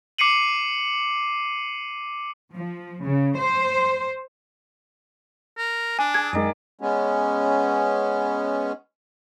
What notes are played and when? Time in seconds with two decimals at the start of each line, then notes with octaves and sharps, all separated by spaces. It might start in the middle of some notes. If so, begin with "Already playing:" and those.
0.18 D6 C7 C#7 D#7 F#7
2.52 F3
3.03 C#3
3.37 C5
5.58 A#4
5.99 D4 G#5
6.14 G#4 G#6
6.33 F#2 D#3 G#3 D5
6.81 G#3 B3 C#4